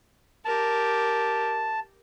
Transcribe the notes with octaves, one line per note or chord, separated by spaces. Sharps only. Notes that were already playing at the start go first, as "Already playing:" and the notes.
G4 A#4 A5